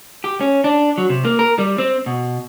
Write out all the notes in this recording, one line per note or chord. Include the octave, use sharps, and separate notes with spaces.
G4
C#4
D4
F#3
C3
A#3
A#4
G3
C4
B2